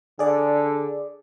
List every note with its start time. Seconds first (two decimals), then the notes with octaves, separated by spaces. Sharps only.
0.19 D3 G#4 D5